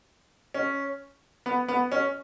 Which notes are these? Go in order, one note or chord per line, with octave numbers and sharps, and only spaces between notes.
C#4
B3
B3
C#4